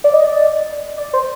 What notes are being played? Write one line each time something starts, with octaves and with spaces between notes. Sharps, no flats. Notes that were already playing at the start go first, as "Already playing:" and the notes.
D5
D#5
D5
D5
C5